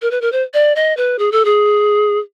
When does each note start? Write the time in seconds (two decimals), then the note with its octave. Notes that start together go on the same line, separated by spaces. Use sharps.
0.02 A#4
0.11 B4
0.21 A#4
0.32 C5
0.54 D5
0.76 D#5
0.97 B4
1.19 G#4
1.32 A4
1.45 G#4